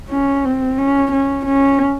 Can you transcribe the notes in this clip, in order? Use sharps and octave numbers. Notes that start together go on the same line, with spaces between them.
C#4
C4
C#4
C#4
C#4